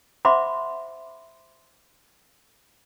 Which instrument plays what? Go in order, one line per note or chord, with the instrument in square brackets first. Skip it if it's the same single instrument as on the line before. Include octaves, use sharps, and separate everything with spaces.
[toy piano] C5 E5 F#5 B5 C6 D6